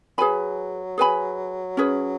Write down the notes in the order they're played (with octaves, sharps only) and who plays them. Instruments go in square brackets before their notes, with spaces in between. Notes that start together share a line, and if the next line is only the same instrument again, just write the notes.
[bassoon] F#3 [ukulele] G#4 B4 G#5 B5
[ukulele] G#4 B4 G#5 B5
C#4 G#4 B4